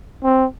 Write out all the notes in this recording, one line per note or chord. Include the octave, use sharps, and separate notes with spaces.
C4